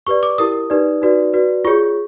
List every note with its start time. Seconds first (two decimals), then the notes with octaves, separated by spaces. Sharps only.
0.07 G4 B4 D5 C#6
0.23 D6
0.38 E4 G4 A#4 D#6
0.70 D#4 G4 B4 D5
1.02 D#4 F#4 B4 D5
1.33 F#4 B4 D5
1.64 F4 G#4 C#5 C#6